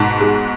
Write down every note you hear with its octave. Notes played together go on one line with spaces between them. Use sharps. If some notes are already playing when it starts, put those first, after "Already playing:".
Already playing: G#2 B2 A5
G#3